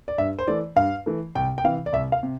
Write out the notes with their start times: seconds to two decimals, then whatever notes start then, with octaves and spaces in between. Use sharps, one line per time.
0.08 D5
0.18 G2 E5
0.39 C5
0.47 E3 A3 D5
0.76 G2 F5
1.06 E3 A3
1.35 C2 G5
1.58 G5
1.64 C3 E3 F5
1.86 D5
1.93 C2 E5
2.12 F5
2.23 C3